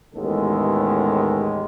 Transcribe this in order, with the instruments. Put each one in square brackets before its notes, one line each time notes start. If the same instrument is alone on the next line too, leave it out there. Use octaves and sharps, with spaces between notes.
[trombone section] A1 D#2 G#3 B3 A4